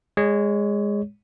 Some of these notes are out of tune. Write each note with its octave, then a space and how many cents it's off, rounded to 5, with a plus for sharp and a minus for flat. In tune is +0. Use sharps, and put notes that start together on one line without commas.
G#3 -15 C#5 +15